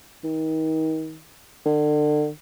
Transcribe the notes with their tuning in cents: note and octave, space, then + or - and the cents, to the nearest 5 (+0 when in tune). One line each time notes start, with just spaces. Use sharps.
D#3 +30
D3 +35